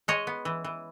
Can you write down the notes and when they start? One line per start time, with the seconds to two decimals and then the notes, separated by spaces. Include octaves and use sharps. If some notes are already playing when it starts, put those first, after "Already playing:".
0.08 G#3 C#5 D#5
0.27 B3
0.45 E3
0.64 E3